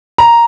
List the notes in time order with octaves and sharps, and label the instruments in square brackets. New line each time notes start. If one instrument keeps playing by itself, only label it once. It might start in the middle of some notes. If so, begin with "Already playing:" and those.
[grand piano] A#5